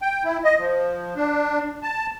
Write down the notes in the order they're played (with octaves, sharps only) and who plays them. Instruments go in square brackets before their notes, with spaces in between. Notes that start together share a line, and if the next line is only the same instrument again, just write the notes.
[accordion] G5
E4
D#5
F3
D4
A5